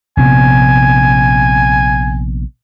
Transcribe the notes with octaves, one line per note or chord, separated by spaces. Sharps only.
A#1 C3 B3 G#5